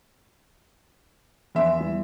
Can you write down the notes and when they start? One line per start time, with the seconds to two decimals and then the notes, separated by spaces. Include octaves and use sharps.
1.55 E2 F3 E5 C6
1.80 G3 B3 E4